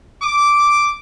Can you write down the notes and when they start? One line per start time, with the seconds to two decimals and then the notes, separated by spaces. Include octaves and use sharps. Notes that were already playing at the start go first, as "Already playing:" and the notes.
0.22 D6